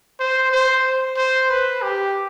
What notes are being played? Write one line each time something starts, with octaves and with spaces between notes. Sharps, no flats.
C5
C5
C5
B4
G4